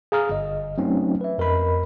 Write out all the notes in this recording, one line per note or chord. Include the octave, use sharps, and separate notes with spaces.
G#4 F5 A#5 D#6 F6
G1 D#5
F#3 A3 C4 C#4 D#4
B4 E5
F2 A#4 D#5 B5